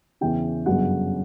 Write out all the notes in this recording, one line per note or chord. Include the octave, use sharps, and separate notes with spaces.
E2 C#3 E3 G5
G1 F#2 C#3 F#3 F#5